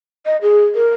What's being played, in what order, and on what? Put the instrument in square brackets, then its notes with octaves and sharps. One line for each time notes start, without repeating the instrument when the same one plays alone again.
[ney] D#5
G#4
A#4